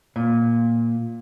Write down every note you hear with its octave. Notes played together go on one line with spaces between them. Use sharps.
A#2